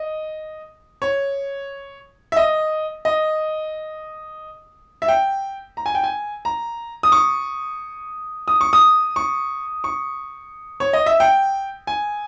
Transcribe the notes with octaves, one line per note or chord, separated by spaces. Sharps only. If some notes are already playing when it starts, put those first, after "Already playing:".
Already playing: D#5
C#5
E5
D#5
D#5
E5
G5
A#5
G#5
G5
G#5
A#5
D#6
C#6
D#6
C#6
D#6
C#6
C#6
C#5
D#5
E5
G5
G#5